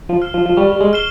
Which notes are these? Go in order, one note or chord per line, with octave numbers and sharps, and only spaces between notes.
F3
F6 C7 E7 G7
F3
F3
G3 C#6
G3
G#3
F6 C7 E7 G7